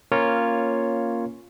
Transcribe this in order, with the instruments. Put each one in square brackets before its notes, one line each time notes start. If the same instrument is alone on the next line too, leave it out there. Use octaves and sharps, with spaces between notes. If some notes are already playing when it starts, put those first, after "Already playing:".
[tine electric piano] A#3 C#4 F4 A#4 C#5